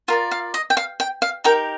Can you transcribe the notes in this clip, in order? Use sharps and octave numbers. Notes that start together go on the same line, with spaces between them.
F4 A#4 D5 F5
F5
D#5
G5
F5
G5
F5
D#4 G4 A#4 G5